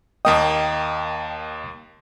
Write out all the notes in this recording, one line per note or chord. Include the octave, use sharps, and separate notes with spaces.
D#2 A#3 D#5 G5 D#6